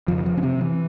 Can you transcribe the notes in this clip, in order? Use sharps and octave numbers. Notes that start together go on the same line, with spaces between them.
F2 C#3 F3
F3
C#4
C3 C4
E3